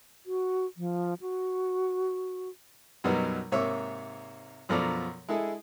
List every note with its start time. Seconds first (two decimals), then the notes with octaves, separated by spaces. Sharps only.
0.26 F#4
0.77 F3
1.21 F#4
3.04 F#2 B2 F#3 G3 B3 D#4
3.52 G#2 C3 A#3 C#5 E5 D6
4.69 F#2 B2 F3 A4 D5 A#5
5.28 G#3 E4 G#4 A4